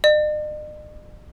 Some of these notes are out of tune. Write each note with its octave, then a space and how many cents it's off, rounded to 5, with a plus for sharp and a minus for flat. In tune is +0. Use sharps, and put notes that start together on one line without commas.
D#5 -45